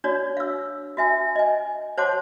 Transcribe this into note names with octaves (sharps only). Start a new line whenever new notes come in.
D4 F#4 C#5 D5
F5 E6
F#4 E5 G#5
D#5 G#5
C5 C#5 F#5 A5 C6 D6